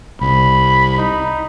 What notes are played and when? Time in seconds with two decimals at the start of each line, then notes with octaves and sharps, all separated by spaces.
0.21 C2 B5
0.98 D#4